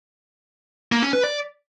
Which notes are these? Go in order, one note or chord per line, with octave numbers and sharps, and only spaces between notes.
A#3
C#4
B4
D5